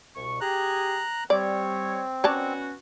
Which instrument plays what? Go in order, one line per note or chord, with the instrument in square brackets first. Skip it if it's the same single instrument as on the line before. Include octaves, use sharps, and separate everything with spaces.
[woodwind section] C2 B2 C#6
[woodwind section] G4 G#4 [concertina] A#5 F#6
[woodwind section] G3 C#5 [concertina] C4 [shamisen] D5
[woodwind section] B3 C#4 F#4 [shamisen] C#5 D5 A5